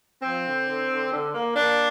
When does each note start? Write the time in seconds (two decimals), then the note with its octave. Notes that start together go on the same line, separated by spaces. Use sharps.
0.22 F3 C4
0.45 D3
0.68 D3
0.89 D3
1.12 D3
1.34 A#3
1.56 A#3 D4